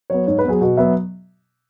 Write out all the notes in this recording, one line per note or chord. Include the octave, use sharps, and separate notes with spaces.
F#3 B3 C#5
G#2 C#5
B4
F#3 B3 G#4
B2 F#4
F#3 B3 E5